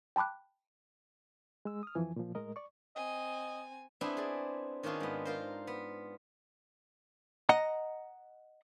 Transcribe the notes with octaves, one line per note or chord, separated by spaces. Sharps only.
G5 A5 B5 D6 F#6
G#3 E6
D#6 F6
F2 E3 F3 G#5
A#2 F3
A2 G#3 A#4 D#5
D5 C#6
C4 D#5 G#5
B3 C4 D4 E4 G#4
G#4 D5
D#3 C#4 D4 F4 G#4
G#2 B3
F4 A#4 C5
B3
D#5 F#5 A#5